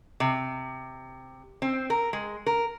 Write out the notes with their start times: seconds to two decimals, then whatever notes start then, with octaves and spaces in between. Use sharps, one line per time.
0.20 C3
1.62 C4
1.90 A#4
2.13 G#3
2.46 A#4